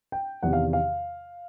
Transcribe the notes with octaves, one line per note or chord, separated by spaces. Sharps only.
G5
E2 C3 D#3 F#5
F5
F5